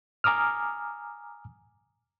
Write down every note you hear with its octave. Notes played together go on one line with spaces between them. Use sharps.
G#5 A#5 D6 D#6 F6